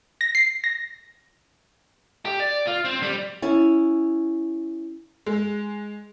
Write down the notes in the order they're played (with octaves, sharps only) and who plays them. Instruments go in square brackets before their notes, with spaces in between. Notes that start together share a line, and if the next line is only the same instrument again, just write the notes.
[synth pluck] A#6
C7
A#6
[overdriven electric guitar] G4
D5
F4
C4
G3
[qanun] C#4 E4
[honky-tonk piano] G#3